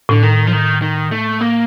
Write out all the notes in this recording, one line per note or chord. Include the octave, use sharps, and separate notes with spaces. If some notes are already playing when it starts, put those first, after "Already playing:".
A2 D3
D#3
F3
D#3
D#3
A3
A#3